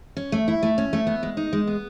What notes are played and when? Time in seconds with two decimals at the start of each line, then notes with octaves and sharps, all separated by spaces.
0.17 C#4
0.32 A3
0.48 E4
0.63 A3
0.78 C#4
0.93 A3
1.07 B3
1.23 G#3
1.37 D#4
1.53 G#3
1.67 B3